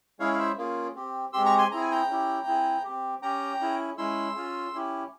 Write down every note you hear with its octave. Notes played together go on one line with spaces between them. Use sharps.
G#3 C#4 E4 G#4 C#5 F5
F5
C5 E5
A#3 C#4 F4 G#4
C4 G4
G#3 C4 G4 C6 E6
A#5 C#6
G#5 C6
C4 E4 G#4 A#5
G#5
G5 A#5
C#4 E4 G4
C4 E4 G#4
C4 G4
C#4 G4 G5 A#5
C#4 E4 G#4
G#3 C#4 E4 C6 E6
C#4 F4 G#4
C#4 E4 G4